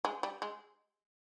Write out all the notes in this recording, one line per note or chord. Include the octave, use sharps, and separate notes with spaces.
G#3
G3
G#3